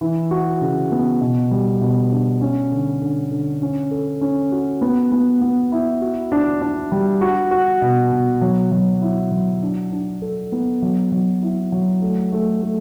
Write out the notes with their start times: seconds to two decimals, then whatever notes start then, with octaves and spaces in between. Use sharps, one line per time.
0.01 E3
0.31 F#4
0.61 C#3
0.91 B3
1.21 B2
1.51 G3
1.81 B2
2.11 D4
2.41 C#4
2.72 D3
3.01 D3
3.31 D3
3.62 C#4
3.91 A4
4.21 C#4
4.52 F#4
4.81 B3
5.12 B3
5.41 B3
5.72 E4
6.01 F#4
6.32 D4
6.61 D4
6.92 G3
7.21 F#4
7.51 F#4
7.81 B2
8.12 B2
8.41 F#3
8.72 F#3
9.02 E4
9.32 F#3
9.62 D4
9.92 D4
10.22 A4
10.52 B3
10.82 F#3
11.12 F#3
11.42 E4
11.72 F#3
12.02 A3
12.32 A3
12.62 A3